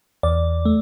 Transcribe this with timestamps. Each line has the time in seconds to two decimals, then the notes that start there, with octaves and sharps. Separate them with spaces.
0.23 E2 D5
0.65 A3